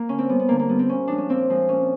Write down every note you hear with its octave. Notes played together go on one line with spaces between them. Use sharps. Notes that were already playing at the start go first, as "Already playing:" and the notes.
Already playing: A#3
D3 C#4
C4
G3 B3
B3
D3 A#3
A#3
G3 B3
C4
A#2 C#4
F3 G#3 D4
C#4
A#2 C4
F3 G#3
A#2 C#4